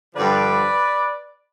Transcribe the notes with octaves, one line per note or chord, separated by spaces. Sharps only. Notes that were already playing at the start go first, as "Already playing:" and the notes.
G2 D3 F3 B4 D5